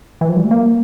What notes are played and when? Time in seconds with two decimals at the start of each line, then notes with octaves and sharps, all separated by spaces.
0.21 E3
0.29 F3
0.36 G3
0.44 A3
0.51 A#3